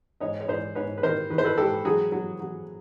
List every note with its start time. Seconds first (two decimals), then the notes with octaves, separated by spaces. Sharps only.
0.20 G#2 C#5 D#5
0.41 C#5
0.48 G#2 C5 D5
0.75 G#2 B4 C#5
0.98 B4
1.03 D#3 A#4 C5
1.30 D#3 B4
1.38 C5
1.45 A4 B4
1.57 G#2 G4 A4
1.85 F#3 F#4 G#4
2.12 F#3
2.40 F#3